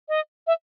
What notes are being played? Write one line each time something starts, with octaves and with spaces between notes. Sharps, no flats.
D#5
E5